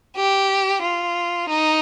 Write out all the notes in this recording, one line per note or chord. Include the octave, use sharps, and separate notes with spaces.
G4
F4
D#4